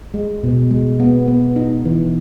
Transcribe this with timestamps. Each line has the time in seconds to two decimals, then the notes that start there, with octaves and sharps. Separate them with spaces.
0.14 G#3
0.43 B2
0.71 G#3
1.00 B3
1.28 B3
1.56 D#4
1.85 E3